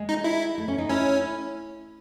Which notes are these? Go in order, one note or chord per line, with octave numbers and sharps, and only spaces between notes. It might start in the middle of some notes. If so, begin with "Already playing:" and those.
Already playing: G#3
D#4
E4
A3
C#4
D#4
C#4 E4